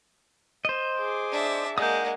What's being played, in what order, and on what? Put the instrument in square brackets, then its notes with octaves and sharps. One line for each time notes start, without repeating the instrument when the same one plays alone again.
[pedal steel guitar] C5 D#5
[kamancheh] G#4 D6
[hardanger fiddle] D4 E5
[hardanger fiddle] G#3 A#3 [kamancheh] F#5 [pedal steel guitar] D#6 G6